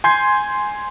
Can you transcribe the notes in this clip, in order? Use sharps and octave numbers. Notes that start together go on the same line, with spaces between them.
G#5 C6 G6 G#6 C7